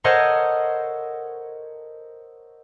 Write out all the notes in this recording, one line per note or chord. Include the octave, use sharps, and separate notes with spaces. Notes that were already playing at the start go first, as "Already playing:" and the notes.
A4 A#4 C5 C#5 D#5 F#5